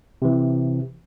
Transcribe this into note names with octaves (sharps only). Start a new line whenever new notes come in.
C3 E3